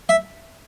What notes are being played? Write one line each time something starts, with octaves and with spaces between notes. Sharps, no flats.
E5